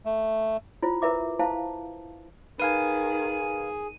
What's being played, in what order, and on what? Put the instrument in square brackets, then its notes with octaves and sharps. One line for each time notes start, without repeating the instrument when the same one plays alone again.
[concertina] A3
[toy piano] E4 F4 C5
E4 A#4 B4 E5 D6
E4 C5 F5 A5
[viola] D#3 [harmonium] G#4 [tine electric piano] B4 F5 G#5 [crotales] D#7